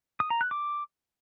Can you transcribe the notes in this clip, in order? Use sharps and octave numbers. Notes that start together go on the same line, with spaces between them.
D#6
A#5
F#6
D6